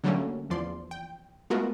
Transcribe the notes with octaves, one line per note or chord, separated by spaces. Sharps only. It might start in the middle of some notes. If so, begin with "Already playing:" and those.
D3 F#3 G3 A3 A#3 C#4
E2 F3 D5 C6
G5
G#3 A3 B3 F4 F#4 A#4